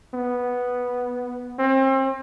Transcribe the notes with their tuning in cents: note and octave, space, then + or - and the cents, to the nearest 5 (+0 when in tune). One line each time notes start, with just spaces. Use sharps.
B3 -5
C4 +35